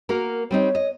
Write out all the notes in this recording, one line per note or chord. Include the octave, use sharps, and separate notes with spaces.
A#3 F#4 A#4
G3 C4 D#4 C#5
D#5